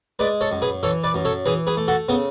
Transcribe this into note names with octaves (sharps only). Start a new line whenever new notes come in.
G#3 B4 D5
A4 C#5
F#2
G#4 B4
E3 A4 C#5
B4 D5
F#2
A4 C#5
E3 G#4 B4
G#4 B4
A3
F#4 A4
C#3 B3